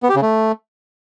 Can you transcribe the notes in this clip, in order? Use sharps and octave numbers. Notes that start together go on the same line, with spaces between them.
B3
G4
C#3
A3